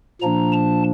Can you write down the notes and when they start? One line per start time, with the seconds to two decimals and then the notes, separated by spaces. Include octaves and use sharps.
0.21 A#2 F3 A#3 D4 A#5
0.52 A5